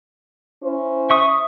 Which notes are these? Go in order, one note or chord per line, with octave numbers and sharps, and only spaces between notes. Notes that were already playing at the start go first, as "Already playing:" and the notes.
C#4 E4 C5
E5 C#6 D#6